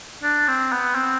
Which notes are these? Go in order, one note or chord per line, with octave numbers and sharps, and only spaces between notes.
D4
C4
B3
C4